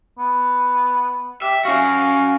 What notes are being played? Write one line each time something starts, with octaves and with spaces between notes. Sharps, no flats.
B3
G4 E5
C#4 F#4 F5